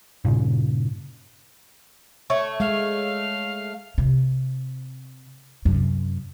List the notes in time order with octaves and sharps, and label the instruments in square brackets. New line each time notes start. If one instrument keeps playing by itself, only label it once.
[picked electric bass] G2 A#2 C#3
[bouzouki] A3 C#5
[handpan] G#3 [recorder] F5
[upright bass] C3
F#2 C3